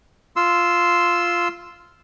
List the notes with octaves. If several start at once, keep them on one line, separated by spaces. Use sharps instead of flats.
F4 C6 E6